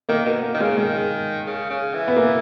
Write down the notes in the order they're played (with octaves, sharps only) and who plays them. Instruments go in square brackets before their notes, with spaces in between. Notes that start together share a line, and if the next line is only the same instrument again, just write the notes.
[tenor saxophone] D#3 [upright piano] A#3
[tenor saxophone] B2
[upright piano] A#3
[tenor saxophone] D#3
[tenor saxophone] C#3 [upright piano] G#3
[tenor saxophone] D#3 [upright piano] G#3
[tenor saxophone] C#3
C#3
E3
[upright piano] B3
A#3